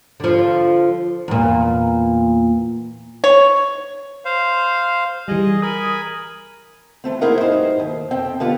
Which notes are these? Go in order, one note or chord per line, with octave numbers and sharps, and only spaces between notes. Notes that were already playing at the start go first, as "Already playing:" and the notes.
D3 F3
E2 A#2
C#5
C5 F5
E3 G3 G#4 D#5
A#4 G#5 B5 D#6
E3 A3 C4
A#3 C4 E4 G#4 A#4 F#5
G2 D#4 C5
D#2
F2 C4 G5
D3 B3 F4 G4